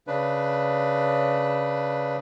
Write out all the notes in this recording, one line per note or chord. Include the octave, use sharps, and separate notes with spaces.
C#3 D4 B4